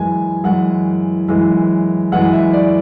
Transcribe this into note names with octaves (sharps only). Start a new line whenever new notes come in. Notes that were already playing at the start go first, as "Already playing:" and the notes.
Already playing: F#2 E3 G#3 G#5
F#2 E3 G#3 F#5
F#2 E3 G#3
F#2 E3 G#3 F#5
E5
D5